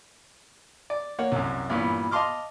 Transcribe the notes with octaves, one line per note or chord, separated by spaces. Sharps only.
D5
A#3 C#5 F#5
C2 F#2
G2 A#2 E3 B3
D#5 F5 A5 C6 D6 F6